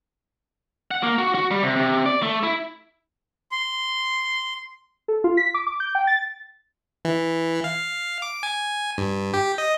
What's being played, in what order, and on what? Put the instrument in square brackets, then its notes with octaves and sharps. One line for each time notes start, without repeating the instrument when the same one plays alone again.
[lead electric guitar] F#5
A#3
F#4
F#4
G3
C3
C3
D5
A3
E4
[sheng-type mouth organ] C6
[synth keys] A4
F4
B6
D6
D6
G6
G5
A6
[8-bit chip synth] E3
F5
D6
G#5
G2
G4
D#5